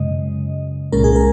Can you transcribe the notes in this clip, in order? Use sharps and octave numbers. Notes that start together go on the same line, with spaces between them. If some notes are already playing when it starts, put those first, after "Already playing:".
Already playing: F#2 C#3 G#3 D#5
C2 A#2 G#3 C#4 A#4
G#4
A#4